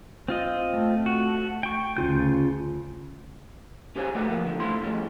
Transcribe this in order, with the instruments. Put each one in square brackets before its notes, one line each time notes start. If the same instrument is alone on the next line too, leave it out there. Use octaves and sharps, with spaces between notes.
[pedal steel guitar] C4 F4 D#5
[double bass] A3
[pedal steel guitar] F#4
G5 C#6
[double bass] D2 [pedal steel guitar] C#3 F4 G6
[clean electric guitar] C#4 G4 G#4 C5 C#5 G#5
A3 F#4 B4 D5 E5 F#5
F3 A#3 B3
E2 D3 F3
A2 A3 C4 E4 F4 C6
A2 F3 G3 G#3 C#4